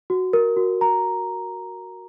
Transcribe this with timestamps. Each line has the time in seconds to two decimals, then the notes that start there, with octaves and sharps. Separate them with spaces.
0.10 F#4
0.33 A#4
0.57 F#4
0.81 A#5